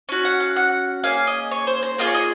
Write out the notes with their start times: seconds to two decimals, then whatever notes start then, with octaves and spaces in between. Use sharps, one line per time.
0.09 C#4 F#4
0.25 F#5
0.40 F5
0.56 F#5
1.04 A#3 C#4 G#4 F5
1.27 D#5
1.51 C#5
1.67 C5
1.83 C5
1.99 A#3 F4 G#4 D#5
2.07 C#5
2.14 D#5